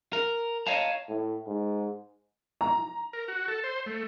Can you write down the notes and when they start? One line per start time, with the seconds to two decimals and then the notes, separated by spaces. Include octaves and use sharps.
0.13 A#4
0.67 C#5 D#5 F5 A5 A#5
1.09 A2
1.47 G#2
2.61 A#5
3.13 A#4
3.28 F#4
3.48 A4
3.64 C5
3.86 A3